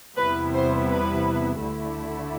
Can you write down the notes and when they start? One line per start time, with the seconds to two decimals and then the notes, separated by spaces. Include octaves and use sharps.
0.17 E2 C3 G3 B3 E4 B4
0.53 C5
0.89 B4
1.60 D2 D3 A3 E4